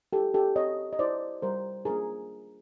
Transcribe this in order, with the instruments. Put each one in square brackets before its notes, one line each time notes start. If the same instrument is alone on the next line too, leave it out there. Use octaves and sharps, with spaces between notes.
[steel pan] E4 G4 A4
G4 A4
C4 C#5 D#5
D#5
E4 G4 C5 D5
G3 A#4 C5
A#3 D4 F4 G#4 A#4